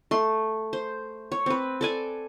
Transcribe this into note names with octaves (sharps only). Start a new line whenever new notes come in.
A3 C6
C5
C#5
C4 B4
A4 D5 G#5